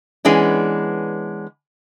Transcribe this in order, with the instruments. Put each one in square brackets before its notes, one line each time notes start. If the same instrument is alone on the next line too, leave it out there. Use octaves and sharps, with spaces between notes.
[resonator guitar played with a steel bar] E3 G#3 B3 C#4 D4